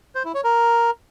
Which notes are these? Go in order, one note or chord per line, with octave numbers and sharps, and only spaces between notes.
C5
E4
C#5
A#4